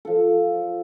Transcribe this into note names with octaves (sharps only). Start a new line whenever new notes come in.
F3 A4